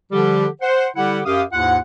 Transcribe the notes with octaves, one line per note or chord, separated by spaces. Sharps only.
D3 F3 G3 G4
C5 F#5
D3 G3 E4 G4 F#5
F#2 G4 F5 D#6
D#2 G#2 E4 F4 F#5